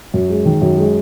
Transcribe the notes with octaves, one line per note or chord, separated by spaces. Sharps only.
F#2
G#3
D#3
F#2
G#3